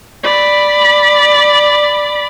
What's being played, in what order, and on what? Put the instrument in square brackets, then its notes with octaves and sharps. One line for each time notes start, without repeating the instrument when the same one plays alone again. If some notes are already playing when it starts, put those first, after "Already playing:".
[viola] D5 B5